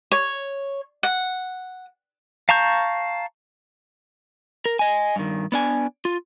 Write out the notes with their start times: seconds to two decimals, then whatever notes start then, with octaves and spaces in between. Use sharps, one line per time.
0.12 C#5
1.03 F#5
2.49 F5 A5 A#5 C#6 G6
4.66 A#4
4.79 D#5 G#5
5.16 G2 D#3
5.52 B3 D4 G#5
6.05 F4